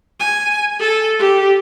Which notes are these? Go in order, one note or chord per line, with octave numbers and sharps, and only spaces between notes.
G#5
A4
G4